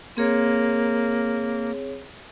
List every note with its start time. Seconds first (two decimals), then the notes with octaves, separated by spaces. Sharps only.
0.17 A#3 C4 G#4 C#5